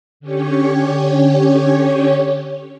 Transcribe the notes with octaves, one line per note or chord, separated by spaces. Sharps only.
D3 C#4 G4 C#5